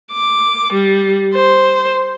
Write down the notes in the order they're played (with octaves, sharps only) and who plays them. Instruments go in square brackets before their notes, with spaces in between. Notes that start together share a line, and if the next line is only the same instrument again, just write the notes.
[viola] D6
G3
C5